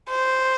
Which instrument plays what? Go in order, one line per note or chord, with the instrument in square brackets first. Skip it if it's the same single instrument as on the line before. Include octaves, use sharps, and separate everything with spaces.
[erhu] C5